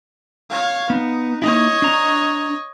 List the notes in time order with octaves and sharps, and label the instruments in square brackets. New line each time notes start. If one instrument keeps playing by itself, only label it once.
[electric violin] C#5 F5
[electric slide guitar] B3 [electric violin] D#4
[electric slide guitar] A#3 D#4 E4 [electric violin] C#5 D#5
[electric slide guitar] D4 A#5